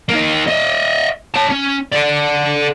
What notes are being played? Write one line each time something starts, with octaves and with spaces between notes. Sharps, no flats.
A#3 D#4
D#5 E5
C#5 A5
C#4
A4 D5